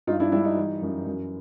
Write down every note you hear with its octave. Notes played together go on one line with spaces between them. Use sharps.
G2 D#4 F4
D4 E4
G3 D4 E4
D#4
E3
F#2
F#2